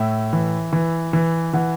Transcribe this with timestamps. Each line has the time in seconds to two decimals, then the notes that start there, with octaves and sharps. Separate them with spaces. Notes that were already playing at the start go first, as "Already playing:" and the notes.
Already playing: A2 E5
0.33 E3
0.73 E3
1.13 E3
1.53 E3 F#5